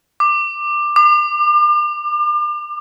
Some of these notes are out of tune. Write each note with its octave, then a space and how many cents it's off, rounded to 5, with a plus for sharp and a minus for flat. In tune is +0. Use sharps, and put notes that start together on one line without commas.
D6 +15
D6 +35